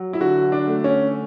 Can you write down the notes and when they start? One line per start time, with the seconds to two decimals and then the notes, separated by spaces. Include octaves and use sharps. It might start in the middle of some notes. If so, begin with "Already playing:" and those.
Already playing: F#3
0.13 E4
0.20 D3 F#4
0.52 D4
0.68 A3
0.84 C#4